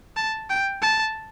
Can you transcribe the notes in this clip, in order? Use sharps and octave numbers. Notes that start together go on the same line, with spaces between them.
A5
G5
A5